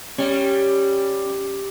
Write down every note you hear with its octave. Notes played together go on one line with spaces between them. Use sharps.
G3 C#4